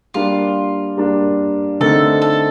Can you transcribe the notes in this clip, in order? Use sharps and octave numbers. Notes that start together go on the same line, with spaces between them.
G3 A#3 D4 F4
G3 A#3 D4
D3 A3 C4 D#4 A4 A#4
A4